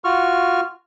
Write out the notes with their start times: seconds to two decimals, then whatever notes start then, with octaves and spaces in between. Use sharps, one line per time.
0.04 F4 F#4 C#6 F6